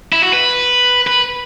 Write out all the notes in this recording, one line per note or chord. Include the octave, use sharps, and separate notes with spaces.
E4
F#4
B4
B4